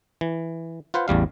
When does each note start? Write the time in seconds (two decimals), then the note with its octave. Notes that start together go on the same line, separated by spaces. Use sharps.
0.21 E3
0.94 F4 B4 C5 F#5
1.08 A1 E2 G3 F5